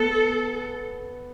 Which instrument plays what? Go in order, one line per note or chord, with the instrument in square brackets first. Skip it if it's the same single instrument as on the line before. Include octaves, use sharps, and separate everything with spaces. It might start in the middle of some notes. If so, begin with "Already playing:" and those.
Already playing: [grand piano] B3 [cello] A4